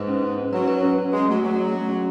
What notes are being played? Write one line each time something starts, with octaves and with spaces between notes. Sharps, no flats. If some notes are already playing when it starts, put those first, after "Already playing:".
Already playing: G#2 B4
C#4
C#4
C#4
F#3 B4
B4
C#4
C#4
G#3 G#4
F#3 A3
F#3 A3
C#4
A3
C#4